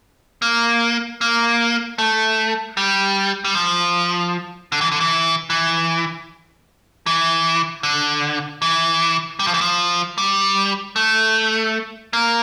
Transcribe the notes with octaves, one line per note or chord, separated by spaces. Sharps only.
A#3
A#3
A3
G3
G3
F3
D3
E3
D3
E3
E3
E3
D3
E3
G3
F3
E3
F3
G3
A3
A#3